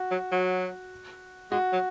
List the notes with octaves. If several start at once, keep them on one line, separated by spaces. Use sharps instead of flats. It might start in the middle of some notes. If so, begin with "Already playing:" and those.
Already playing: F#4
F#3
F#3
G#3 F#4
F#3